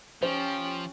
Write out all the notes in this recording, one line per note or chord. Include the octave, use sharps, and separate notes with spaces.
F3 C#4 G4 C5 G5